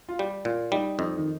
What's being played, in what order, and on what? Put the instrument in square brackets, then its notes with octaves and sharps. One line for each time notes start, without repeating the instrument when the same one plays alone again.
[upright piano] F4
[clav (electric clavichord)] G3 [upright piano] G4
[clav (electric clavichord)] A#2 [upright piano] F4
[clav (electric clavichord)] G3 [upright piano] D#4
[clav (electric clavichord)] F2 [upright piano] D#4
[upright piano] D#3